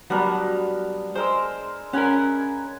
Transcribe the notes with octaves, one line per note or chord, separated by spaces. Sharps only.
F#3 G3 B3 D4 F#4 A#4
G#3 A#4 C5 E6
C#4 A#4 F#5 G#5 B5